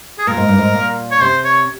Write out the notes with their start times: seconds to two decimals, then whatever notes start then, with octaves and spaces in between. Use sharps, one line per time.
0.19 G#4
0.27 A#2 A#4
0.37 G#2
0.48 G2
0.58 G#2
0.74 A#2
1.11 C#5
1.21 C3 C5
1.44 C#5